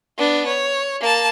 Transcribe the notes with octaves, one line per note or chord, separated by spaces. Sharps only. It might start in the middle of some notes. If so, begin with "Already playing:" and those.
B3 D4
C#5
A#3 A5